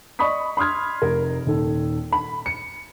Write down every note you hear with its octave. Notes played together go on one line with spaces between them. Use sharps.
D5 D#5 B5 C#6 D#6 B6
B5 C6 D#6 F6 G#6
F1 A#4
D#1 D#3 A4
B5
C#7